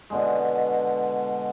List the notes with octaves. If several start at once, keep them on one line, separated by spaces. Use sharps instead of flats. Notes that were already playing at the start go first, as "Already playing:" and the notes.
B2 D3 G#3